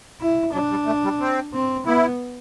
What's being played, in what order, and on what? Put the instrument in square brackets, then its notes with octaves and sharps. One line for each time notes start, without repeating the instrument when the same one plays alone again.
[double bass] E4
[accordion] F#3 [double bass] D4
[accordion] G3
A3
G3
C4
[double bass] C4
[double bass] B3 [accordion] E4